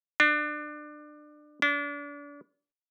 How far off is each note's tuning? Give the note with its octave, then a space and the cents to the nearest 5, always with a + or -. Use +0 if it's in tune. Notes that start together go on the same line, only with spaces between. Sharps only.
D4 +25
D4 -35